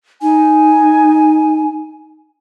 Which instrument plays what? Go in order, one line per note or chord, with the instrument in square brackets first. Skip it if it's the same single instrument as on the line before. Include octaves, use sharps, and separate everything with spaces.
[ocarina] D#4 [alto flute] G#5